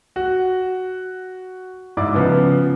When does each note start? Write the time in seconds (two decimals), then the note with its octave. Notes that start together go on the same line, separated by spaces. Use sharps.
0.16 F#4
1.97 G#2 E4 D5 D6
2.14 C#3 F3 B3